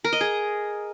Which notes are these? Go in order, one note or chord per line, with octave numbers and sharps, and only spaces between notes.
A#4
D#5
G#4